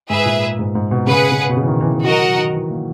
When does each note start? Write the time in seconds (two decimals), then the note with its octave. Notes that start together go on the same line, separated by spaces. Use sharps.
0.10 G#2 G#4 B4 E5
0.26 A#2
0.59 G#2
0.75 G#2
0.91 B2
1.07 C#3 G#4 B4 F#5
1.32 C#3
1.49 B2
1.57 C#3
1.63 E3
1.68 D#3
1.81 E3
1.92 E3
2.05 F#3 F#4 A#4 D#5 F#5
2.22 F#3
2.38 D#3
2.53 E3
2.70 A#3